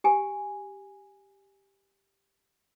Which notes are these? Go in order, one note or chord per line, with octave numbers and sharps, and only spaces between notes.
G4 G#5